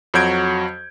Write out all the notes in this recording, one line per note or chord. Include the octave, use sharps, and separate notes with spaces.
F2 F#3 F#4 G6 G#6 D7